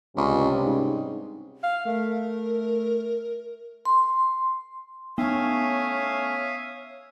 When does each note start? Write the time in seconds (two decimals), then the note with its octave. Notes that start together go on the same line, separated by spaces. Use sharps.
0.17 C#2 G2 C3 C#4
0.65 G#2
1.64 F5
1.86 A3 A#4
3.85 C6
5.18 A3 B3 C#4 C#5 E5 F5 D#6